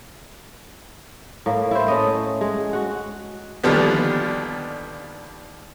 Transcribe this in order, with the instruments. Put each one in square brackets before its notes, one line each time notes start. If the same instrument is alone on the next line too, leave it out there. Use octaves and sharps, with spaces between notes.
[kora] A2 A#3
E4 C5
A3 C#4 D#5
G#3
F#4 F#5
[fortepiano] D#2 A#2 D3 F3 G3 B3